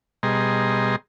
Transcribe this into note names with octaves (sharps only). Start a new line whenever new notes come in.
B2 G3 G#4 D#5 A#5 C6